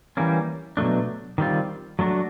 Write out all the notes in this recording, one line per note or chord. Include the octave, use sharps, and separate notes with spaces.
E3 G3 A#3 C#4
B2 F#3 A3 D4
D#3 G3 C4 F4
F#3 A3 D4 F#4